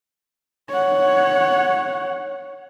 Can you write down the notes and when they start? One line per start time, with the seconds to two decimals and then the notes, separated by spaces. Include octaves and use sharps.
0.70 C#5 F#5